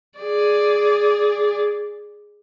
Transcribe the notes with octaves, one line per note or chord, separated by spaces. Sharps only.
G#4 D5